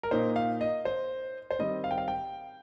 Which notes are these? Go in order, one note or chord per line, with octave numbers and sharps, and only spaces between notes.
A#4
A#2 A#3 D#4 C5
F5
D#5
C5
C5
D#3 G3 C4 D#5
F5
G5
F5
G5